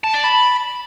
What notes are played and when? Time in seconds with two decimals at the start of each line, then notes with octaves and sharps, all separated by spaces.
0.04 A5
0.14 D5
0.24 B5